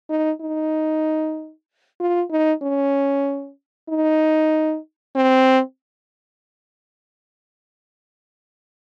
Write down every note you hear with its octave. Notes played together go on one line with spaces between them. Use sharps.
D#4
D#4
F4
D#4
C#4
D#4
C4